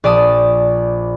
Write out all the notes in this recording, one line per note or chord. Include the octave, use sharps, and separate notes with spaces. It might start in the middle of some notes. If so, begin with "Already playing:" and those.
A#1 D5 A5 D#6